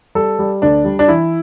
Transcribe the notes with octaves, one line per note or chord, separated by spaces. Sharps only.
G3 A4
G3
D2 D4
G3
D4
E3 E4